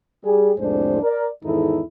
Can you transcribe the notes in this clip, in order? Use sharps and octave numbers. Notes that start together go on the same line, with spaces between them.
G3 G#4
C2 F2 A2 G#3 D4 C5
A#4 D5
E2 G#2 D#3 D#4 E4 A4